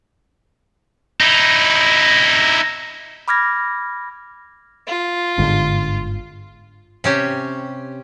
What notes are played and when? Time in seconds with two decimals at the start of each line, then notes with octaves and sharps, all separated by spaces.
1.20 D#4 E4
3.28 B5 D6 F6 G#6 A#6
4.87 F4
5.38 G1 G#2 D3
7.04 C3 C#4 G4